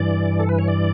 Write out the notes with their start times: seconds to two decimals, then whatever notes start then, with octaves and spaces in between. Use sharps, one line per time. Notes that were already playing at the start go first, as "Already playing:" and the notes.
Already playing: G2 E3 D5
0.39 A4
0.49 B4
0.59 C#5
0.68 D5